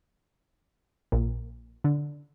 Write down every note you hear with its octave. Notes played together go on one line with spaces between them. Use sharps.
A#1 A#2
D3